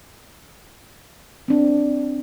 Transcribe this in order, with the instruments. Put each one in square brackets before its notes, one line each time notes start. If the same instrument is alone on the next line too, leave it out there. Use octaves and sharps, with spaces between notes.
[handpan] C4 D4